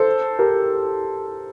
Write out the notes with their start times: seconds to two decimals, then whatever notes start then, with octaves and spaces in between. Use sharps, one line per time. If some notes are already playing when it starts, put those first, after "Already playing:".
Already playing: A4 C5
0.39 G4 A#4